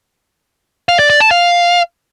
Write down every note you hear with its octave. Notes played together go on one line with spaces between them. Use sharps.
F5
D5
D5
A5
F5